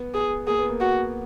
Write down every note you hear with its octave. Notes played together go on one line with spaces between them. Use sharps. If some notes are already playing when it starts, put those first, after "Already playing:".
Already playing: B3
G#4
A#3 G#4
B3
A#3
F#4